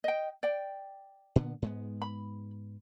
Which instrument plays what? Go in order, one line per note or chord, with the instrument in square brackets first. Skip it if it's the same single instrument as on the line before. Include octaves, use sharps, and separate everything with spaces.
[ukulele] D#5 G5
D5 G5
[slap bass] A#2 D3 B3
G#2 G#3 B3
[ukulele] B5